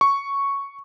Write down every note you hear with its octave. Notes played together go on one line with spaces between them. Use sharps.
C#6